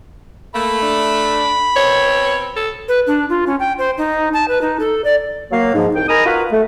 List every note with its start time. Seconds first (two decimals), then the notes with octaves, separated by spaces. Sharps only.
0.55 A3 A#3 B5
0.82 D4
1.76 B2 C4 C#5
2.56 A4
2.88 B4
3.07 D4
3.29 F4
3.47 C#4
3.60 G5
3.78 C5
3.98 D#4
4.33 A5
4.48 B4
4.61 D#4
4.80 A4
5.04 D5
5.51 F#3 A#3 F5
5.74 G#2 F3
5.95 C2 G5
6.08 D#4 A#4 G#5 A#5 B5 D#6
6.25 F4 F#4 A#4 B4
6.52 A3